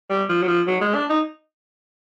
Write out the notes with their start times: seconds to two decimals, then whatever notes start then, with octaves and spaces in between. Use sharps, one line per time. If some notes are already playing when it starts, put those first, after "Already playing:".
0.10 G3
0.29 F3
0.42 F#3
0.48 F3
0.67 F#3
0.81 G#3
0.94 D4
1.10 D#4